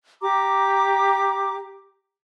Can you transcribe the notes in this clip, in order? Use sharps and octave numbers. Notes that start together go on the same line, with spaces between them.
G4 A#5 D6